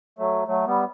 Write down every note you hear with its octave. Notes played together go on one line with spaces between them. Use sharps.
F#3 A3
F#3 A3
G3 B3